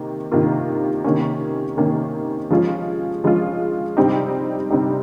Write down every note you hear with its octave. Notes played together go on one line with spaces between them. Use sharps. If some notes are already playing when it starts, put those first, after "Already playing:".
Already playing: C3 D#3 A#3
C3 D#3 A#3 F4
C3 D#3 A#3 C#4
C3 D#3 A#3 C#4
F3 G#3 C#4 F4
F3 G#3 C#4 F4
C3 G3 C4 D#4 G4
C3 G3 C4 D#4 G4